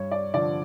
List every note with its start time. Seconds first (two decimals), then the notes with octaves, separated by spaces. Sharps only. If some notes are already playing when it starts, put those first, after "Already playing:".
Already playing: G2 C#5
0.11 D5
0.34 D3 F3 D5